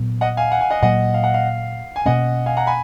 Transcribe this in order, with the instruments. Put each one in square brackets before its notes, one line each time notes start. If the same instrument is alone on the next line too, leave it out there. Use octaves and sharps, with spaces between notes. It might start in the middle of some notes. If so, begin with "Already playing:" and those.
Already playing: [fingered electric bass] A#2 F#3 B3
[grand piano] D#5 F#5
F5 G#5
F#5
G#5
D#5 F#5
[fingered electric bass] A#2 F#3 A#3 [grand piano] D#5 F#5
[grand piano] F5
F#5
F5
G#5
[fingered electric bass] B2 A#3 C#4 [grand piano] D#5 F#5
[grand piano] F5 G#5
F#5 A#5
G#5 B5